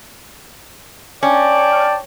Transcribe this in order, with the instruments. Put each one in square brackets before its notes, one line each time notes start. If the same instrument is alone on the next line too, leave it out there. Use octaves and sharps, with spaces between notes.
[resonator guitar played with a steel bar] C#4 [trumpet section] D5 G5 A5